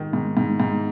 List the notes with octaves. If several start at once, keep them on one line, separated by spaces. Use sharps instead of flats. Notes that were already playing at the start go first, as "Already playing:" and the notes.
Already playing: G#2 D#3
G#2
G#2
G#2